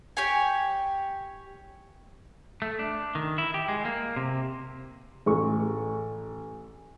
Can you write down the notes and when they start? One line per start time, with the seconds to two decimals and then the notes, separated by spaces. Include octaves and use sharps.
0.17 G4 C#5 G#5
2.62 A3
2.79 D4
3.15 D#3
3.38 E4
3.54 G4
3.68 G#3
3.85 A#3
4.16 C3
5.26 A1 C#6